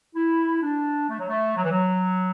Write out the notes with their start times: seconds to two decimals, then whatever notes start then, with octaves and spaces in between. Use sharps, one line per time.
0.15 E4
0.62 D4
1.10 A3
1.19 F#3
1.29 A3
1.56 F#3
1.64 E3
1.71 F#3